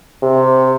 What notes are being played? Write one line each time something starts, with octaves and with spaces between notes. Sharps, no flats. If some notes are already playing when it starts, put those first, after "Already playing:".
C3